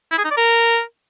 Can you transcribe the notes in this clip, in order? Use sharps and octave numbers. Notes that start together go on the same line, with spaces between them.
E4
G#4
D#4
D5
A#4